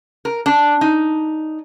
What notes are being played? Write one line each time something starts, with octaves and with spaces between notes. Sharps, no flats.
A#4
D4
D#4